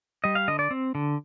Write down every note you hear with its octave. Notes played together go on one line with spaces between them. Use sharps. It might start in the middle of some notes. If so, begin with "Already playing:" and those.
G3 D#5
F5
D3 D#5
D5
C4
D3